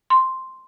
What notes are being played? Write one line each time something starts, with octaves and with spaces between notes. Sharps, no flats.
C6